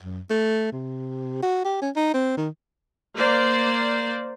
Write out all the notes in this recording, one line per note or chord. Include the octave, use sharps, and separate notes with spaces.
F#2
A3
C3
F#4
G4
C#4
D#4
C4
D#3
A#3 C5 D5